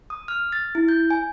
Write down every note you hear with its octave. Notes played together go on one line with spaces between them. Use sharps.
D#6
F6
A6
E4
G6
G#5